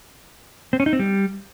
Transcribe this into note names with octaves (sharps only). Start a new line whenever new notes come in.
C4
C#4
D#4
C4
G3